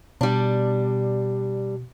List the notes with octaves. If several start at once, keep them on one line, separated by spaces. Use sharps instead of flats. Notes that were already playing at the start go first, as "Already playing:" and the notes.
B2 G3 D4